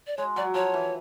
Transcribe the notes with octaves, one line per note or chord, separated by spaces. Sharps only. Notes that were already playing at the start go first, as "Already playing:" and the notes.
D5
G#3 C#5
F#3 D5
F3 C#5
E3